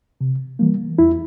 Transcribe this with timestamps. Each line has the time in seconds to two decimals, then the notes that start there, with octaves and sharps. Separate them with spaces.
0.21 C3
0.59 E3 G3 A#3
0.99 E2 E4